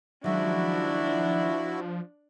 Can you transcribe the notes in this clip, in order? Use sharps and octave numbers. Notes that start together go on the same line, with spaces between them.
D#3 F3 F#3 G#3 D4 E4 F#4